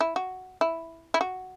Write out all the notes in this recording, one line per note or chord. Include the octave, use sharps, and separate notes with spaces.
E4
F#4
E4
E4
F#4